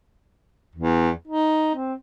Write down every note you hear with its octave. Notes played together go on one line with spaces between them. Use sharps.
E2
D#4
C4